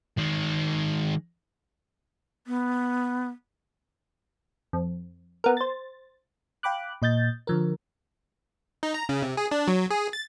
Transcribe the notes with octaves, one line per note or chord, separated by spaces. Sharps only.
D#3 G#3
B3
F2
B3 A#4
C5 A6
F5 G5 B5 D6 F#6
A#2 D#5 G6 A6
D3 F3 A#4
D#4
A#5
C#3
C3
G#4
D4
F#3
G#4
A6